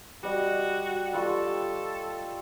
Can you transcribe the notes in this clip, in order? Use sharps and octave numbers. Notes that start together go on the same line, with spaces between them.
G3 F#4 D#5
G3 F4 A4 C#6